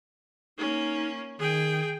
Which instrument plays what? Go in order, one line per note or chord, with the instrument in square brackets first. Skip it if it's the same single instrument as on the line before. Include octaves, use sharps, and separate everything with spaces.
[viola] A#3 C#4 [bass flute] D#4
[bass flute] D#3 [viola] G#4 G5